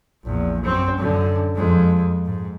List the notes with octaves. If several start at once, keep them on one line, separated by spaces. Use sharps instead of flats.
A#1 E2
F#2 C4
F#2 D3
F2 G#3
G#2